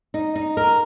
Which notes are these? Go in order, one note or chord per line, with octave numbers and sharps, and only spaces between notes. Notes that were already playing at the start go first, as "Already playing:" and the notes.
D#4
D#4
A#4